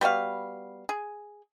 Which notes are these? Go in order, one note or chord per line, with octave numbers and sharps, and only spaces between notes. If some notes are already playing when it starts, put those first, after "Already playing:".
G3 B3 F#4 F5
G#4